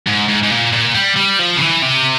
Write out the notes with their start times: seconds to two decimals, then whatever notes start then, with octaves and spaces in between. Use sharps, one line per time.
0.07 G#2
0.29 G#2
0.43 G#2
0.51 A#2
0.73 A#2
0.95 G3
1.16 G3
1.39 F3
1.57 C#3
1.61 E3
1.82 C3